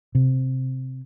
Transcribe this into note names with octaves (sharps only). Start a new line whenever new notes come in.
C3